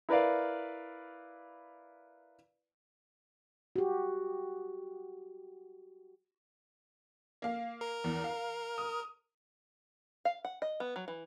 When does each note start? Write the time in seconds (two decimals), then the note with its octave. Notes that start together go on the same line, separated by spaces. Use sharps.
0.09 E4 A#4 B4 D5 F5
3.76 F#4 G4
7.42 A#3 F5
7.81 A#4
8.04 E2
8.24 F5
8.78 D#6
10.25 F5
10.45 F#5
10.62 D#5
10.80 B3
10.96 F#3
11.08 E3